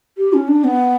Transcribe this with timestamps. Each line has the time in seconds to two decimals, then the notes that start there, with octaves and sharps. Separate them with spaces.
0.18 G4
0.33 C#4
0.48 D4
0.64 B3